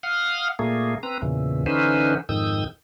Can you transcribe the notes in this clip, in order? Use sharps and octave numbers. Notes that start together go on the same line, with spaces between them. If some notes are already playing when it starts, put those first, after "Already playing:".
F5 F#5 D#6 F6
A#2 A3 A#3 G#4
C4 B4 A#5
E2 A#2 C#3 E3
D3 E3 C#4 D#4 B4 C5
F2 G#2 D#3 D#6 E6 G6